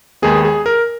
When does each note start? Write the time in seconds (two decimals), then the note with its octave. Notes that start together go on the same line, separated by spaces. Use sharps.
0.22 D#2 D#3 G#3 B3 G#4
0.45 G#4
0.66 A#4